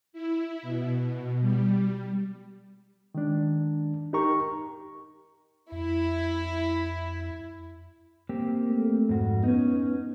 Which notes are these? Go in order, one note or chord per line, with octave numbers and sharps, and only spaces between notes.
E4
B2
G3
D#3 G#3 D4
D#4 G4 A#4 A#5 C#6
F2 E4
A#3 C4 G4
A3
F2 G#2 F#4
B3 C#4 D#4